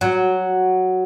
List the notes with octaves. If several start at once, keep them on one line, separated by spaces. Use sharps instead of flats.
F#3